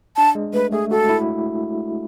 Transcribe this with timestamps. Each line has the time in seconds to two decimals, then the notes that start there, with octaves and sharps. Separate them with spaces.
0.17 D4 A5
0.35 G#3
0.54 A3 B4
0.72 A3 G#4
0.91 F#4 A4
1.09 E4